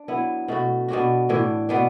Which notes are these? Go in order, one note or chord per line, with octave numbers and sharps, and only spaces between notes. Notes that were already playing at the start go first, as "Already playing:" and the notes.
Already playing: D4
F#3 B3 E4
B2 A3 F#4
B2 B3 D4 F#4
A2 E3 D4
B2 B3 D4